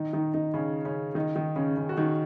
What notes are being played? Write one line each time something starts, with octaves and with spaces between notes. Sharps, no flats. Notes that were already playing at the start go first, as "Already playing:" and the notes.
Already playing: D#3 D#4
D#3 D#4
D#3 D#4
C#3 C#4
C#3 C#4
D#3 D#4
D#3 D#4
C#3 C#4
C#3 C#4
F#4
D#3 D#4